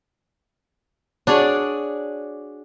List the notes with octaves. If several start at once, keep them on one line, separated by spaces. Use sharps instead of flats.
D4 F#4 G#4 C#5 D5